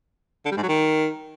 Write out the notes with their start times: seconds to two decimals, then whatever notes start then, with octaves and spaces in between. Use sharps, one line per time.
0.45 D3
0.51 G3
0.57 G#2
0.63 F#3
0.68 D#3